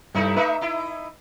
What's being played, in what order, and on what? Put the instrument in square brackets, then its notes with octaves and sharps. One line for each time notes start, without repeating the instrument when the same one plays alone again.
[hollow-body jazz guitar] G2 A3 [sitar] C3 D#4 E4
[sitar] A3 D#4 E5 [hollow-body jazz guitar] B4
[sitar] D#4 E4